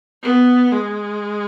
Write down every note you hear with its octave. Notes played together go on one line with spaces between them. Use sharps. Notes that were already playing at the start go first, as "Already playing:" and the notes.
B3
G#3